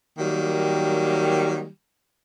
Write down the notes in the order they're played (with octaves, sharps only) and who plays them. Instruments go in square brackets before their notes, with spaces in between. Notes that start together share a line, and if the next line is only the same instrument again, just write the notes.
[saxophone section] D#3 F#3 G3 A#3